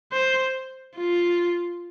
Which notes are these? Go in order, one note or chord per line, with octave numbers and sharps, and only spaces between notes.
C5
F4